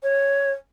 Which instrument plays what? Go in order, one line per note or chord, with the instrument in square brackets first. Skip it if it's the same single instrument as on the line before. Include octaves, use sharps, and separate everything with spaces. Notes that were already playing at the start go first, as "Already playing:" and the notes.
[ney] C#5